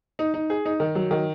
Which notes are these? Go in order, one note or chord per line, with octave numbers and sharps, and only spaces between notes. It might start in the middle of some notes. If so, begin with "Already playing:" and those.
D#4
D#4
G#4
D#4
D#3
F#3
D#3